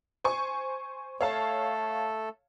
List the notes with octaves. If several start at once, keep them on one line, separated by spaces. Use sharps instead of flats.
C5 G#5 C#6
A3 A4 C#5 F5 A5